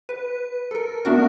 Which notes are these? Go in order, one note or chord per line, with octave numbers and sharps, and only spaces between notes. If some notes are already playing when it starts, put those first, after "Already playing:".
B4
A4 A#4
A3 B3 D4 F#4 A#4